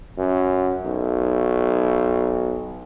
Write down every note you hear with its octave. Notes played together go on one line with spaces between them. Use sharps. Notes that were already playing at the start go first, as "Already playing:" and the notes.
F#2
B1